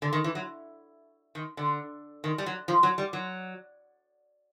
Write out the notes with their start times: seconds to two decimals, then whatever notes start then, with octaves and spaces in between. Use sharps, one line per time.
0.02 D3
0.13 D#3
0.24 E3
0.35 F#3
1.35 D#3
1.57 D3
2.24 D#3
2.38 G3
2.46 F#3
2.68 F3
2.83 F#3
2.98 G3
3.13 F#3